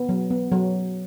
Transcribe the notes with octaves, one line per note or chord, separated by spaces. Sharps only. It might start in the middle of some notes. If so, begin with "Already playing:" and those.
Already playing: B3
F#3
B3
F#3